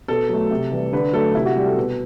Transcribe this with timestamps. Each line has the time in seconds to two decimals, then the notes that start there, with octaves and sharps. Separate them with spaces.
0.08 B2 A4
0.29 F#3 A3
0.51 C3
0.71 E3 G3
0.93 D3 B4
1.13 F#3 A3 A4
1.35 C3 E4
1.46 F#4
1.56 G3 G4
1.66 A4
1.77 B2